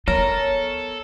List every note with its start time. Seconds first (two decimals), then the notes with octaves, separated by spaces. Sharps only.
0.08 B3 A4 A#4 C#5